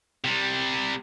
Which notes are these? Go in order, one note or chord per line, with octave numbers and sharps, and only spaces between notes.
C3 G3